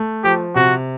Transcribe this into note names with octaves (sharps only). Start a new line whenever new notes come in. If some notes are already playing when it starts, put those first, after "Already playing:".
Already playing: A3
F3 G4
C3 F#4